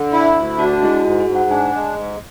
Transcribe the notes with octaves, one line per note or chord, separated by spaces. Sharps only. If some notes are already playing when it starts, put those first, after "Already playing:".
Already playing: D3
E4
D2
D4 F#4
F#4
G#3 E4
F#4
G#2 F#4
G#4
G#2
F#5
D4 G#5
G#3
G#2